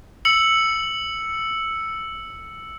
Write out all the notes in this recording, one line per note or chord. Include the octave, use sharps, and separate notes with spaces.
E6 C#7 F#7